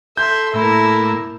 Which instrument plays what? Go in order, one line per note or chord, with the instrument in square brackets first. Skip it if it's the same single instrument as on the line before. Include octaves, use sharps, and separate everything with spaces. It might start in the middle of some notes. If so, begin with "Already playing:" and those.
[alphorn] A4 [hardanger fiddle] E5 C6 [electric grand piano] G6
[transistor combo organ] A2 A#3 E6 [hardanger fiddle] E4 A#4